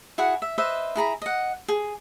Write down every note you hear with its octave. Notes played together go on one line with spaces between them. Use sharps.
E4 F#4 G#4 F#5
E5
B4 C5 D#5 E5
E4 G#4 A#5 B5
D#5 F#5
G#4